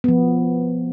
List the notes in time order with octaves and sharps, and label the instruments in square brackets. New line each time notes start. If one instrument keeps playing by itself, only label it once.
[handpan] F3 B3